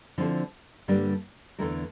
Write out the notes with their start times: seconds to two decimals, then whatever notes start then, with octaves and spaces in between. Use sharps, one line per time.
0.18 D3 F3 C4 E4 A4
0.88 G2 D3 G3 A#3 D4
1.59 E2 D3 A3 E4 A#4